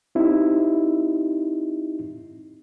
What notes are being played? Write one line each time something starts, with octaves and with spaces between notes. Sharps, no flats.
C4 D#4 E4 G4